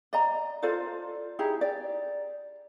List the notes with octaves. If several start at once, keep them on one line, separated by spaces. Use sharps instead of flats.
D5 D#5 A#5
F4 A4 C5 D5
D#4 E4 G4 G#4
D5